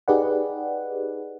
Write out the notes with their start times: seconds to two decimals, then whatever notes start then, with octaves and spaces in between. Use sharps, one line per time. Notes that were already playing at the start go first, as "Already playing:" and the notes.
0.08 D#4 G4 G#4 B4 D5 F#5